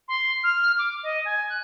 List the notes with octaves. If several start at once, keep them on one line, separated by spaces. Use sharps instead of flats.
C6
F6
D6
D#5
G#5
F#6